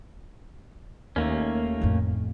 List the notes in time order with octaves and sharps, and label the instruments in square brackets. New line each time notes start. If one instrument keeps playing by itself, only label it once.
[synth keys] D#2 [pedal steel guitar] A3 A#3 C#4
[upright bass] A1 F2